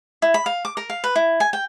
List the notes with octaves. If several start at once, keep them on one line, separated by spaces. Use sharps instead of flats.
E4
B5
F5
D6
A#4
F5
B4
E4
G#5
G5